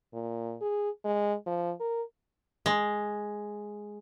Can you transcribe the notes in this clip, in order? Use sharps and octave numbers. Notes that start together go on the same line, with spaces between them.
A#2
G#4
G#3
F3
A#4
G#3